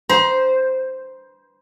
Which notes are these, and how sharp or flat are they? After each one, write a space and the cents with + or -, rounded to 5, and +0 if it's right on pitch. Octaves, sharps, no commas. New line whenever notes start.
C5 -5 A#5 +45